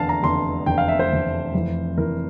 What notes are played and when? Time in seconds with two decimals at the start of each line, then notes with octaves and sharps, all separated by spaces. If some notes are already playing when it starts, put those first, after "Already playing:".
Already playing: F1 E2 D3 F5 A5
0.09 A#5
0.23 F1 E2 D3 C6
0.66 F1 E2 D3 G5
0.78 F5
0.88 E5
0.99 C5
1.11 F1 E2 D3
1.54 F1 F2 E3
1.98 F1 F2 E3 A#4